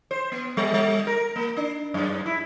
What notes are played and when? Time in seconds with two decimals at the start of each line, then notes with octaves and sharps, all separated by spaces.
0.11 C5
0.32 B3
0.57 G3
0.74 G3
1.07 A#4
1.36 A#3
1.57 D4
1.94 F#2
2.26 E4